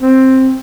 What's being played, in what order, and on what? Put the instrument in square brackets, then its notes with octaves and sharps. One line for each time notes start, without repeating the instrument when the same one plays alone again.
[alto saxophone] C4